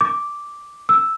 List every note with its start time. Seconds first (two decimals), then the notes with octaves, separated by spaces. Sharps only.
0.01 D6
0.89 E6